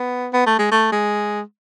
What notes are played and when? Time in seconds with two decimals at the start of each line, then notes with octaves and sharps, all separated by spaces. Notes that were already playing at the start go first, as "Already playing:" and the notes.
Already playing: B3
0.33 B3
0.46 A3
0.59 G#3
0.71 A3
0.92 G#3